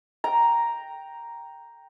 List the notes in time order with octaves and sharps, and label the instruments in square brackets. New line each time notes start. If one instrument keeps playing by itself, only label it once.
[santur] G5 A#5